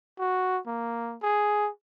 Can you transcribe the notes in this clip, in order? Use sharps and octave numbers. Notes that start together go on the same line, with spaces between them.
F#4
A#3
G#4